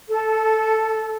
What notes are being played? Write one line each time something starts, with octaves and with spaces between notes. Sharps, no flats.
A4